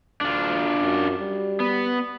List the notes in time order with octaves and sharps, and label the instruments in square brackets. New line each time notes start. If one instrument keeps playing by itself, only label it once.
[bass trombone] D2 [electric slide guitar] D4 F4
[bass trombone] F#2
G3
[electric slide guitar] B3